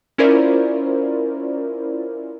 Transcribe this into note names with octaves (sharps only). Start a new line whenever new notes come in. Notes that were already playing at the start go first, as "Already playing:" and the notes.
C#4 E4 F4 A#4 C5 D5